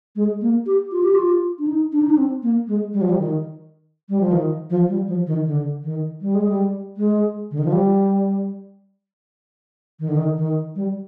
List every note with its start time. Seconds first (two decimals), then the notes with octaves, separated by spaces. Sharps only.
0.16 G#3
0.41 A#3
0.66 G4
0.92 F4
1.03 G4
1.15 F4
1.59 D4
1.67 D#4
1.93 D4
2.03 D#4
2.10 D4
2.18 C4
2.43 A#3
2.68 G#3
2.93 G3
3.01 F3
3.09 G3
3.18 D#3
4.09 G3
4.21 F3
4.32 D#3
4.70 F3
4.89 G3
5.08 F3
5.27 D#3
5.45 D3
5.83 D#3
6.21 G3
6.35 G#3
6.49 G3
6.97 G#3
7.51 D3
7.59 D#3
7.65 F3
7.73 G3
10.00 D#3
10.09 D3
10.17 D#3
10.37 D#3
10.75 G3